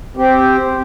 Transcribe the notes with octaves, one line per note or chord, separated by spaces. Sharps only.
C4 G4